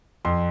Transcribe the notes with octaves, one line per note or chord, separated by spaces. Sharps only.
F2 C6